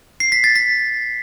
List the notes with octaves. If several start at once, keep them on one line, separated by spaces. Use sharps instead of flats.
C7
B6
A6
B6